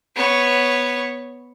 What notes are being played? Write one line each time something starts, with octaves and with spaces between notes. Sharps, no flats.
B3 C#5